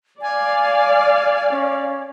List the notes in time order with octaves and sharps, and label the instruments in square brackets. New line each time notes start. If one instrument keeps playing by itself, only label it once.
[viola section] D5 F5 [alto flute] G#5
[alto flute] C#4